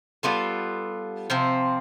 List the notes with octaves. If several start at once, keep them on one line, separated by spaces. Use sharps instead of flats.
G3 B3 F4 A4
C3 F3 C4